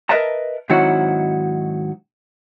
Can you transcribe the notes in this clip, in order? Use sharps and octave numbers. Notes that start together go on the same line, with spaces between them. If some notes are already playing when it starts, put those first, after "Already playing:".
A#4 B4 D#5 E5 A5 A#5
G#2 D#3 F#3 C4 E4 F#4